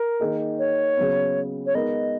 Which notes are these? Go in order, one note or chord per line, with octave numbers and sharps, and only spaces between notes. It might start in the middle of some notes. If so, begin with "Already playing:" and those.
Already playing: A#4
D#3 A#3 D#4 G#4
C#5
C#3 F#3 B3
C#5
G#3 B3 D#4 A#4 D#5